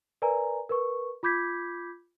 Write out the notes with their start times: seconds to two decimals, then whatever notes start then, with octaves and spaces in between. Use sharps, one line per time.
0.22 A#4 B4 D5 G#5 A#5
0.69 A#4 B4 C#6
1.23 F4 B5 D6 G6 G#6 B6